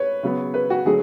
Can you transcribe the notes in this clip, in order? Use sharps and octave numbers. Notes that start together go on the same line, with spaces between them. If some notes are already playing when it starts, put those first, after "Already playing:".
Already playing: B4 C#5
C#3 F#3 B3
B4
F#4
D3 F#3 A3 G#4